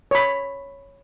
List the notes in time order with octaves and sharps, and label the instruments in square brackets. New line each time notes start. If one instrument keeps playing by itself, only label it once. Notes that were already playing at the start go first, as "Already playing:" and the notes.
[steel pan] C#5 B5